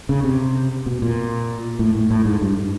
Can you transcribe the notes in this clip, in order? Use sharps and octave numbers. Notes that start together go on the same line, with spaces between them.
C#3
C3
B2
A#2
A2
A2
A2
G#2
G2